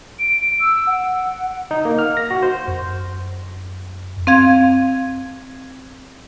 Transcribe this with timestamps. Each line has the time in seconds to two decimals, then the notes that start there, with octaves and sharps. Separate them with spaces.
0.19 D7
0.60 E6
0.87 F#5
1.71 D#4
1.85 A#3
1.99 F6
2.17 A#6
2.31 F#4
2.43 C5
2.68 F#2
4.27 C4 F5 G#6